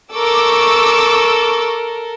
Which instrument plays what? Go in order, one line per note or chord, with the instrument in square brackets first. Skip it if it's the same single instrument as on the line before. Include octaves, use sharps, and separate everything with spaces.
[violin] A4 A#4 [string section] C#6 D6 E6